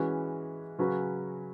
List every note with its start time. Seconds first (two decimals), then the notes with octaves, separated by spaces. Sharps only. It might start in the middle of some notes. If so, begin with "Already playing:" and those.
Already playing: E3 G#3 C#4 F#4 B4
0.78 C#3 F#3 C#4 F#4 B4